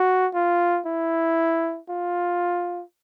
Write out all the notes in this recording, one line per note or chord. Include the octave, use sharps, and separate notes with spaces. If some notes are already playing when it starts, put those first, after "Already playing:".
Already playing: F#4
F4
E4
F4